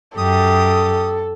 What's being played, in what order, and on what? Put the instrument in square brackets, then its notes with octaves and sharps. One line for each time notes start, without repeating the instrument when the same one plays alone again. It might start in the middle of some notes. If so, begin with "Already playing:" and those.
[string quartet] F#2 G4 [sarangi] A4 [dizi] D#6